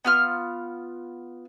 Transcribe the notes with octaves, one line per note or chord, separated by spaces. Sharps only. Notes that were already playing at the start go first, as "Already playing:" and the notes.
B3 F4 F6